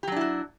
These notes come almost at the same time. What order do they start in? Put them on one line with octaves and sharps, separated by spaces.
G4 F#3 D4 E4 F#4